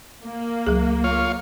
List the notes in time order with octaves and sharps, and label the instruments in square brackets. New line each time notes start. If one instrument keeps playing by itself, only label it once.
[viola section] A#3
[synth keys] C#2 [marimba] F#3 G#4
[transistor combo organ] F4 C#5 F5